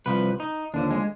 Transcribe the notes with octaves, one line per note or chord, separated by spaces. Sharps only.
C2 C3 F3 B4
D#4
D#2 D3 F3 D4
G#3